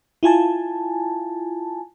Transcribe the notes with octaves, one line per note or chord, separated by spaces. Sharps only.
E4 F4 G#5 A5